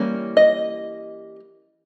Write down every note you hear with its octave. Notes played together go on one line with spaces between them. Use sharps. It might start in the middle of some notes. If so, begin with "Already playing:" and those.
Already playing: E3 G3 A#3 C#4
D#5